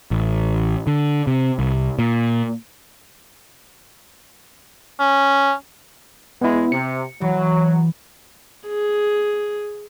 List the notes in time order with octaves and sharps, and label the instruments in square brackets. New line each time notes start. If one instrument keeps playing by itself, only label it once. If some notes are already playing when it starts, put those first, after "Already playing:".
[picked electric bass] A1
D3
C3
C2
A#2
[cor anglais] C#4
[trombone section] E2 G#3 [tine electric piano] B3 E4
[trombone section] C3 [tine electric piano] C#7
[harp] E3 [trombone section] F#3
[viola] G#4